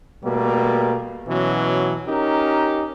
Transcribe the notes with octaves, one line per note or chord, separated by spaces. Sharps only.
B2 G3 A3 A#3
B2 E3 F#3 C#4
C#4 D#4 G4 A#4